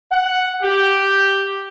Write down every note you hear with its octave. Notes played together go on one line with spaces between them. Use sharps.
F#5
G4